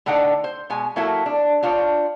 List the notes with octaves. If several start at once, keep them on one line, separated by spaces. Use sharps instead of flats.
A2 D3 D4 D#4 F#5 G5
C5
B2 G#3 G#5
F#3 A#3 E4 F#4 A4
D4
D4 F4 C5 C#5